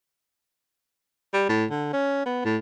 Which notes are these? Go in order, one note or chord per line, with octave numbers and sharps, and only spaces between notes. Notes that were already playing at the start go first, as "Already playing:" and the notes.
G3
A2
D3
C#4
B3
A2